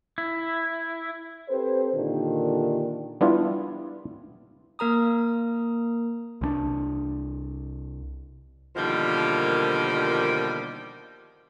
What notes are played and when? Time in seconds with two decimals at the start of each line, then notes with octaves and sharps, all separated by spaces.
0.18 E4
1.48 C4 G4 A4 B4 C5
1.93 A#2 D3 D#3 D4 F4 G4
3.21 G3 B3 D4 E4 F4
4.79 A#3 A#4 A#5 D#6
6.41 C2 G3 D4
8.75 B2 D3 D#3 F3 G3 A#3